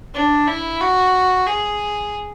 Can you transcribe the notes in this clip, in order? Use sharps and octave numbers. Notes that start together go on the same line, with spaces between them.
D4
E4
F#4
G#4